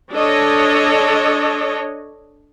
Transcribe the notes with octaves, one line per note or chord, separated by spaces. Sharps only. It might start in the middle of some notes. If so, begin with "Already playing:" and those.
D4 A4 C#5 D#5